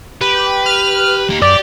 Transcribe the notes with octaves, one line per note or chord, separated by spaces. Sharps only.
G4 B4
F6
A#3 D#4
F#2 G4 D5